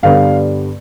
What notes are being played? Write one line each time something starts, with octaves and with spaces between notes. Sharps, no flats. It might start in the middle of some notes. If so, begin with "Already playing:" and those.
G2 D3 G3 B3 F5